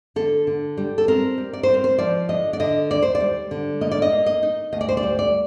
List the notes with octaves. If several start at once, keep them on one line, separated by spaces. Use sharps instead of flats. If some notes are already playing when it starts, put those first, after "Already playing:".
D3 A4
D3
G3
A4
C4 A#4
G3
D5
C5
C4
A#4
C5
F3 D5
D3 D#5
D5
D3 D#5
D#2 D5
C5
D5
G3
D3
A#3 D#5
D5
D#5
A#3
D#5
D#4
D2 D#5
D5
C5
D5
G3
D5